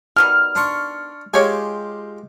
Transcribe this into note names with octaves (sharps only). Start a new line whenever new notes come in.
B2 D#3 G3 F6
D4 C6 C#6
G#3 F4 G4 C#5 G#5